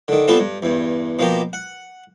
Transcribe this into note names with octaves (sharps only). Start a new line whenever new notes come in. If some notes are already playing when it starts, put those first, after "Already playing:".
D3 D#3
G3 B3 C4 F4 A4
G2
E2 G2
B2 F3 A#3 G4
F#5